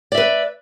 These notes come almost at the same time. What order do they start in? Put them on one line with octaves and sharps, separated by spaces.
D5 E5 B4